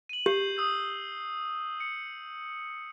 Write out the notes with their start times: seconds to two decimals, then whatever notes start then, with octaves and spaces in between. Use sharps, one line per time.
0.09 D#7 F#7
0.26 G4 G6 C7
0.57 D#6 E6 G6
1.80 C#7